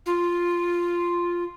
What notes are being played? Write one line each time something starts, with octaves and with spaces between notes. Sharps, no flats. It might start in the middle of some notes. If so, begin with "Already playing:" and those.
F4